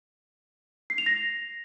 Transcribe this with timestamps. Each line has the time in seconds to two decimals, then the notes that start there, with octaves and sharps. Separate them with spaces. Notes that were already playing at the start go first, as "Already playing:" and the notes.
0.90 C7
0.98 F7
1.06 A#6